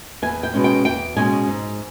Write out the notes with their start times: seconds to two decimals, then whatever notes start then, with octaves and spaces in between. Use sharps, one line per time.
0.22 E2 G#5
0.43 G5
0.54 B2 G#3 C#4
0.64 G5
0.85 E2 G5
1.17 B2 G#3 C#4 G#5
1.48 G#2